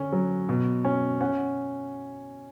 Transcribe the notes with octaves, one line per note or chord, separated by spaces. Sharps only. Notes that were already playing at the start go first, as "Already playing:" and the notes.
Already playing: D3 C#4
F#3
B2
C#4
C#4 F#5